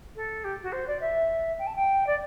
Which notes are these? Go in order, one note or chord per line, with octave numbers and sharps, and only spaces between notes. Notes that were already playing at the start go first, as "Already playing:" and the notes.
A4
G4
F#4
C5
D5
E5
G5
A5
G5
D5